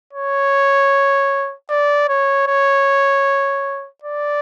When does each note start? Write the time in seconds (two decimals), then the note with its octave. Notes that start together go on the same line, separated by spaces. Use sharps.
0.13 C#5
1.70 D5
2.08 C#5
2.47 C#5
4.03 D5